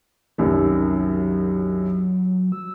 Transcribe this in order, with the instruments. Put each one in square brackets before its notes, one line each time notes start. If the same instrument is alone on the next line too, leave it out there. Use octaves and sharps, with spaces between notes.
[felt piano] C2 F#2 D#3 [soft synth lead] F#3
[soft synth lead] E6